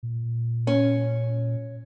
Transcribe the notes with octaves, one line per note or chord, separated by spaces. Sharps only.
A#2
C#4